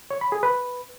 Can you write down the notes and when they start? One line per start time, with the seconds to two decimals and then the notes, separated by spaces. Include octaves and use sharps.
0.11 C#5
0.21 B5
0.32 G#4
0.43 B4